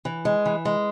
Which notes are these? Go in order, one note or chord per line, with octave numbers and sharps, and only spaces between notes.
E3
G#3
E3
G#3